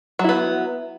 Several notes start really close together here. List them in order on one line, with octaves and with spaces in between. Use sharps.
F#3 E4 B3